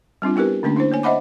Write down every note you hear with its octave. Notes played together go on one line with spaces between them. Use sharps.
G3 C4 D4 F4
B3 E4 G4 A#4 B4
D3 A3 A#3 C#4 D4
D4 E4 C5
A#3 C#5 G#5
C5 D#5 E5 F#5 B5 D6